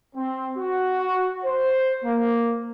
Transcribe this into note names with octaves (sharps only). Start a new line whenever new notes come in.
C4
F#4
C5
A#3